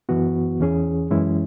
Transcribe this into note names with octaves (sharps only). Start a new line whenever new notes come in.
F#2 E3 B3 F#4
E2 E3 C#4 G#4
F#2 E3 G#3 C#4 E4